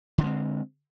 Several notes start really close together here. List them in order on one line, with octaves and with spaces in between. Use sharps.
D3 D4 G#3 C4